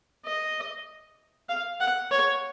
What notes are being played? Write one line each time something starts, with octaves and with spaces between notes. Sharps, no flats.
D#5
F5
F#5
C#5